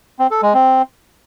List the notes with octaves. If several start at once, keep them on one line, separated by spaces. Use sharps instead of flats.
C4
A4
G#3
C4